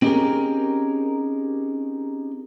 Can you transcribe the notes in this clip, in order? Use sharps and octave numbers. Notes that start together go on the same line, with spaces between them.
C4 C#4 D#4 G4 G#4 A#4